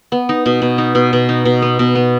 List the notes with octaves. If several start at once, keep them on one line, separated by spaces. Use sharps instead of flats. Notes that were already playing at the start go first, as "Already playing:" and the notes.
B3
D#4
B2
B2
D#4
B2
B2
D#4
B2
B3
B2
B3